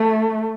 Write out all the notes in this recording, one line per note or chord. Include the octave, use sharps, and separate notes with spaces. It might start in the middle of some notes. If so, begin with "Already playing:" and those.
Already playing: A3